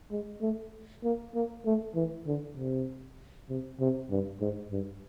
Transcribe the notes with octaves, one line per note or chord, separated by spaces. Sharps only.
G#3
A3
A#3
A#3
A3
E3
D3
C3
C3
C3
G2
G#2
G2